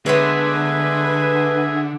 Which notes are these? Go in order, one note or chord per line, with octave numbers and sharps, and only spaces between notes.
D3 G#3 A3 B3 G#4 B4 E5